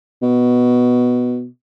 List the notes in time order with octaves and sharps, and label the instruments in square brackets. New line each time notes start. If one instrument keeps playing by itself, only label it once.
[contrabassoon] B2